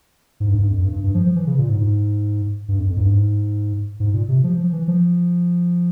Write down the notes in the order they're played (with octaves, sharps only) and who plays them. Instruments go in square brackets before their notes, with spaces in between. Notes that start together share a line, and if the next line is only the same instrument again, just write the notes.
[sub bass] G#2
G2
G#2
G2
F2
G2
G2
G2
F3
F3
E3
C#3
A#2
G#2
G#2
G2
F2
F2
G#2
G2
G#2
G#2
A#2
C3
F3
F3
E3
F3